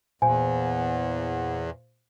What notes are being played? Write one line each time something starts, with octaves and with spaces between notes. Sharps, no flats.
E2 A#2 C5 F5 G#5